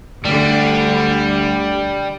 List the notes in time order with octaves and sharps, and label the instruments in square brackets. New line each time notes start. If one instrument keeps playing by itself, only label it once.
[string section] D2 D3 [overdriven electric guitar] G3